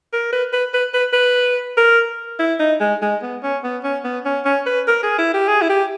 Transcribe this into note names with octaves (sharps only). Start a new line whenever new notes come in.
A#4
B4
B4
B4
B4
B4
A#4
E4
D#4
G#3
G#3
B3
C#4
B3
C#4
B3
C#4
C#4
B4
A#4
G#4
E4
G4
G#4
E4
G4